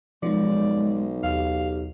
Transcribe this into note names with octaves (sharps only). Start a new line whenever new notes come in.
B1 F3 G#3 D#4 D5
D#2 G4 F5